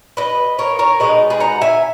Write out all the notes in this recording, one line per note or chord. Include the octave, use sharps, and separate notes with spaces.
B4 D#5
A#4 C#5
A#4 C#5
B2 G#3 D#4 B4 D#5
G#4 B4
F#5 A#5
E5 G#5